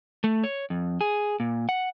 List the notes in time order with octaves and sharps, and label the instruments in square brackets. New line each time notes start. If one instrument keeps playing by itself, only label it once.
[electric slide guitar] A3
C#5
F2
G#4
A#2
F#5